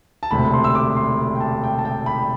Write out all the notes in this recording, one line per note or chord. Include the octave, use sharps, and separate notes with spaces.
A5
E1 D2 C3 B5
C6
E6
D6
C6
G5
A5
G5
A5
G5
B5